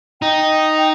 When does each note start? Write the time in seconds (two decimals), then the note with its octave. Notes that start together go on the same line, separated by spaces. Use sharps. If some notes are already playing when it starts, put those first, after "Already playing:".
0.22 D#4 G5
0.78 G5